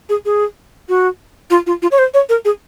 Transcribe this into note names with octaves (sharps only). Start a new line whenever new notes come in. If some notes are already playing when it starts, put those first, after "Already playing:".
G#4
G#4
F#4
F4
F4
F4
C#5
C5
C#5
A#4
G#4